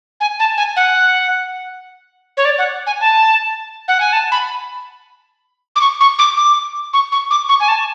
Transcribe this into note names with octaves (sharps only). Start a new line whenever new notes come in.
G#5
A5
G#5
F#5
C#5
D5
F#5
G#5
A5
F#5
G#5
A5
B5
D6
C#6
C#6
D6
D6
C#6
C#6
D6
C#6
G#5
A5